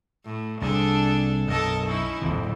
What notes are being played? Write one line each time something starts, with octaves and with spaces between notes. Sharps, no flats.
A2
C2 C3 D4 G#4 A4
B1 F#2 A4 A#4 D#5
C#4 D#4 E4
D1 G1 F2 A#2